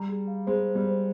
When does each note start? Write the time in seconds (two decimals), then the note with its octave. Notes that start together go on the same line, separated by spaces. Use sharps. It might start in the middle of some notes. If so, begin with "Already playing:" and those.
Already playing: G3 A#5
0.09 G#4
0.27 F5
0.47 G#3 C5
0.66 C5
0.75 G3
0.86 C5